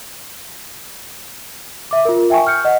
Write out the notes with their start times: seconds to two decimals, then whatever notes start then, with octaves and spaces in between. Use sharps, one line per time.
1.91 E5 D6
2.05 F4 A#4
2.30 E5 G5 G#5 C#6
2.47 F6 G6 C#7
2.65 D#5 F#5